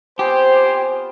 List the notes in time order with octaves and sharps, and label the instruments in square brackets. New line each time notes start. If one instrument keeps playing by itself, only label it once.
[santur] B3 C4 F4 [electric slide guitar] G4 [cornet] C5 [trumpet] G#5